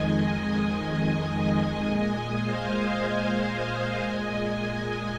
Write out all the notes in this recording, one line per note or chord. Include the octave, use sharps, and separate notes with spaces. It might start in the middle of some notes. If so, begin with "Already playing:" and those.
Already playing: F2 D#3 G#3 D#5 G#5
D#5 G#5
A#2 G#3 D#5 G#5
C5 F5
D#5 G#5
A#2 G#3 D#5 G#5